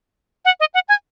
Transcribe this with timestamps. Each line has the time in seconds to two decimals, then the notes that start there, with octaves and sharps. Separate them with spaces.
0.45 F#5
0.60 D#5
0.74 F#5
0.89 G#5